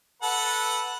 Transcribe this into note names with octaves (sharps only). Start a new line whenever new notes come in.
A4 B4 F#5